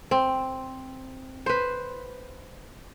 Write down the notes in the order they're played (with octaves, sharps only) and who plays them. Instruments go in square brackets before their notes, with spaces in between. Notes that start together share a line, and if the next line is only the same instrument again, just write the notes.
[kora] C4
B4 C5